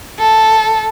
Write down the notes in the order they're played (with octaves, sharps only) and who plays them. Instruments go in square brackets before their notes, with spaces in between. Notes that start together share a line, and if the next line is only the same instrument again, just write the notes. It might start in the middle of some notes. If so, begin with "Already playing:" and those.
[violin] A4